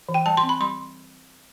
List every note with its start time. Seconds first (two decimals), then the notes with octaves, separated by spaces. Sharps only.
0.09 E3
0.14 G5
0.26 G3 A5
0.37 C6
0.43 C4
0.49 B5
0.61 G3 C6